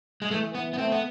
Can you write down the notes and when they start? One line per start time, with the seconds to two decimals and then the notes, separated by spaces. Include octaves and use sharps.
0.22 G#3
0.31 E3 A3
0.55 E3 B3
0.73 B3
0.78 A3 C4
0.92 B3